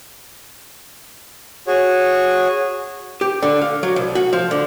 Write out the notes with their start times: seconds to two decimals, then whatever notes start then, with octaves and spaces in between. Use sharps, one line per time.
1.67 F#4 G#4 C#5
3.21 G4
3.42 D3
3.61 F5
3.83 F#3
3.96 C2
4.15 F#4
4.33 F3
4.51 D3